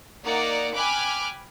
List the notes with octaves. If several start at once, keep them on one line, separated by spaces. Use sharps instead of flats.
A#3 D#4 D5 F#5 A#5
G5 G#5 B5 D6 F6 F#6